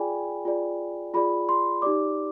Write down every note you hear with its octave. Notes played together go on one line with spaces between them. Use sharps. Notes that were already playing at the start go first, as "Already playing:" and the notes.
Already playing: F4 G#4 D5 G5 G#5 B5
F4 G#4 D5
F4 G#4 D5 B5
C6
D#4 G4 D5 D6